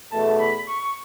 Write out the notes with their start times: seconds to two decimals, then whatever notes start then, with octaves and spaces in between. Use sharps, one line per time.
0.11 E2 B2 A3 A5
0.40 B5
0.68 C#6